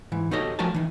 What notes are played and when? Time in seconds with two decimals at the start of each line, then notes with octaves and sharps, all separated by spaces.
0.12 G#2 E3
0.31 D#4 F#4 G4 A4 C#5 D#5
0.59 F3 A3 F#4 A#4 G#5 A5
0.74 E3 D#4